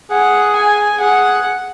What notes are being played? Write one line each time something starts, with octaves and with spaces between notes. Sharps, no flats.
G#4 F#5
G#5
G#4 F#5